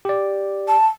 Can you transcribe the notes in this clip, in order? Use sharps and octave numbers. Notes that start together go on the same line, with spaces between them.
G4 D5
A5